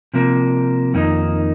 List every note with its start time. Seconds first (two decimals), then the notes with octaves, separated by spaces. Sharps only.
0.14 C3 F3 A#3
0.94 F2 D#3 A#3 D#4